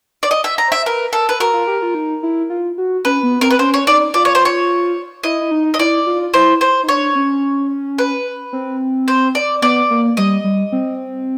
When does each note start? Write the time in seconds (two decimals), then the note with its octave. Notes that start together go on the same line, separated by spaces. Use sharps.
0.23 D5
0.31 D#5
0.44 E5
0.58 A#5
0.68 C5 E5
0.86 A#4 B4
1.12 A4 A#4
1.29 B4
1.40 F#4 A#4
1.54 F4
1.67 G4
1.82 F4
1.95 D#4
2.23 E4
2.50 F4
2.78 F#4
3.05 C#4 B4
3.23 B3
3.41 C4 A#4
3.51 B4
3.59 C#4 C5
3.74 C#5
3.87 D#4 D5
4.14 F4 D5
4.25 C#5
4.35 C5
4.45 C#5
5.24 E4 D#5
5.41 E4
5.51 D#4
5.74 D#5
5.79 E4 D5
6.06 F4
6.34 E4 C5
6.61 C5
6.83 D#4
6.89 D4 C#5
7.15 C#4
7.98 B4
8.53 C4
9.08 C5
9.35 D5
9.62 B3 D5
9.90 A#3
10.17 G3 D#5
10.44 G3
10.72 C4